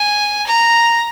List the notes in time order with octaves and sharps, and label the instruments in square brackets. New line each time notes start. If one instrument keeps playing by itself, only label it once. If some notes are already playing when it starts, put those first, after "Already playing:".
Already playing: [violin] G#5
A#5